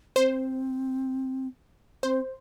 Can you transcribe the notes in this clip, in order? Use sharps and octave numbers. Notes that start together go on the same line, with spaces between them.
C4 C5
C4 C5